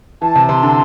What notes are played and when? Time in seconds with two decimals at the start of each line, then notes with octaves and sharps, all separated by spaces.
0.22 E3 A5
0.36 C3
0.49 C3 C6
0.63 D3